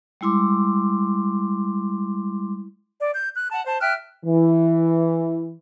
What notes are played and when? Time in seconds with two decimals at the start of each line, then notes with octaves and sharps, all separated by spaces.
0.21 G3 G#3 E4 C6 D6
3.00 D5
3.12 G6
3.35 F#6
3.52 F#5 A5
3.67 C5 A5
3.81 E5 G5 F6 F#6
4.26 E3